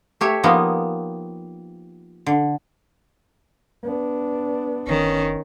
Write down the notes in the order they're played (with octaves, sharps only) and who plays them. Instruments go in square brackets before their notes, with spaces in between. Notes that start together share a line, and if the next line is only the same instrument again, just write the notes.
[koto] A3 G4 C#5 E5
F3 A#3 B3 D#4
D3
[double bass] B3 D4
[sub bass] F#1 [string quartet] D#3 C#4